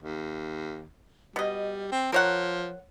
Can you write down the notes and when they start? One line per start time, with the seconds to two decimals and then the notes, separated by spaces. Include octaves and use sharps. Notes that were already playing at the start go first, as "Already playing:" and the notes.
0.02 D#2
1.36 B2 G3 D#5
1.91 C4
2.12 F3 A#4 C#5 F#5